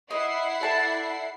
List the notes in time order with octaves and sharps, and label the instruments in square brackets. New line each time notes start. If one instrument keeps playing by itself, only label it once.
[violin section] E4 F#5 C7 [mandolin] D#5
[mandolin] A4 D5 A5